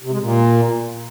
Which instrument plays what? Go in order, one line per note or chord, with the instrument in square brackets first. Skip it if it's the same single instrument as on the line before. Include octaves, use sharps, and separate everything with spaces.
[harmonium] C3
G#3
A#2